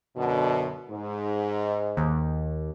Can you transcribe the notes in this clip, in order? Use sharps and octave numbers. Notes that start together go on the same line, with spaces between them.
F#2 B2 D3
G#2
D#2